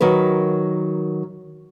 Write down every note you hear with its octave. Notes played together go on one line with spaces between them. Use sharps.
D#3 F#3 A#4 B4